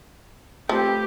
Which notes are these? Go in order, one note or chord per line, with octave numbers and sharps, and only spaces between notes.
F3 A3 C4 G4 B4